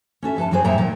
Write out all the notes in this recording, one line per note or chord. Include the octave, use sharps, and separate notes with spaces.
C#4 F#4 A4 E5
F2 A4 B4 A5
F#2 F#3 C4 F#4 G#4 C5
F#2 A#2 C5 E5 G5 A#5
A#2 D#3 F#3 A#4